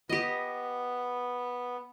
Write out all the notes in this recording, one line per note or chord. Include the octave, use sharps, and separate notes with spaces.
B3 G4 D#5